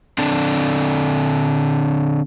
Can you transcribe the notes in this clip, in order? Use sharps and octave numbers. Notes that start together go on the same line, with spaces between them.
D3 C4 D4 A4